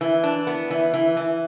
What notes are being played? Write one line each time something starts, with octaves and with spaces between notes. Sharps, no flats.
E3
D4
B3
E3
E3
E3